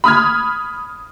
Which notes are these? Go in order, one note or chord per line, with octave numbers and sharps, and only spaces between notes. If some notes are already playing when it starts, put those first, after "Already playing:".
B5 D#6 F6 G#6